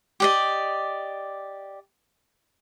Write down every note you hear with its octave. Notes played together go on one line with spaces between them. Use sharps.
G4 D5 D#5